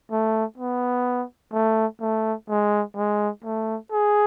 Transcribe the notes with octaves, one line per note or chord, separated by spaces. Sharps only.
A3
B3
A3
A3
G#3
G#3
A3
G#4